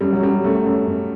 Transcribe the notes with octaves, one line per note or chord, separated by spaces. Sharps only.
F#2 G3
F#3
F#2 G3
F#2 A3
F#2
F#2